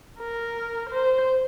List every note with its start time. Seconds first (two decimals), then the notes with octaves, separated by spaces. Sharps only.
0.19 A#4
0.90 C5